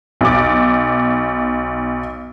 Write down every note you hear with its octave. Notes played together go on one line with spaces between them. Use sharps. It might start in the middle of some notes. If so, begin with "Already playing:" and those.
B1 D6